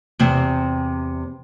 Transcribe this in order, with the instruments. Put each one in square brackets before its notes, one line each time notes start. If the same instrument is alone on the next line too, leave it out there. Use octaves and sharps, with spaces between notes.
[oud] E2 C3 C4